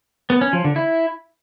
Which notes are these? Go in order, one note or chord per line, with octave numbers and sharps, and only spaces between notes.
B3
C#4
F3
D3
E4